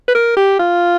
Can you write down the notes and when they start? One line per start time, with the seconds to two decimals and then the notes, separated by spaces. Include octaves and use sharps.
0.08 B4
0.15 A#4
0.37 G4
0.59 F4